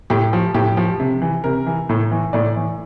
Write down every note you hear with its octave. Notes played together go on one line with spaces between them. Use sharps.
A2 G4
F3
A2 G4
F3
C3
E3
C3 A#4
E3
A2
E3
A2 D5
E3